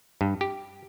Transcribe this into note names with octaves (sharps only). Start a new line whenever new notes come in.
G2
G4